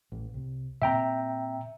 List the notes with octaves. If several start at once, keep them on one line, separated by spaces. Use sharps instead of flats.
A1
C2
A#2 C4 E5 G5 A#5